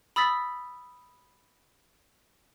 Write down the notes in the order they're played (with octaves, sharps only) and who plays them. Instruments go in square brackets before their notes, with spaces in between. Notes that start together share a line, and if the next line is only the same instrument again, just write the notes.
[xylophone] B5 D#6 E6 A6 B6